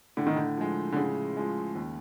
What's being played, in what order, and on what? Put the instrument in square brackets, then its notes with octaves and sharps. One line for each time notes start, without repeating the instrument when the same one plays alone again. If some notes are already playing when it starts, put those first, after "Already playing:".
[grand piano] A2 [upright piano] D3
[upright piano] D#3
D3
[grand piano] F3 G#3
[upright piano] D3
[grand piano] A2 [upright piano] C#3
[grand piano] F3 G#3
D#2